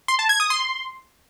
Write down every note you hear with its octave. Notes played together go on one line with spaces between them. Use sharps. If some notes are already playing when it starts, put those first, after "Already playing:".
C6
A5
G#6
D#6
C6